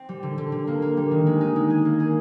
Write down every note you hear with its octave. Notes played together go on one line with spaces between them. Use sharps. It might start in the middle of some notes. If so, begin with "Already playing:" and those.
Already playing: C4
G3
D3
D3
D3
A#3
A#3
G3
D#3
G#3
D#4
G#3
G#4
A#3
G#4